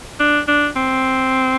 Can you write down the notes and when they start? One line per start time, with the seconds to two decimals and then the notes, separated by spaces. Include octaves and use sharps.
0.20 D4
0.48 D4
0.76 C4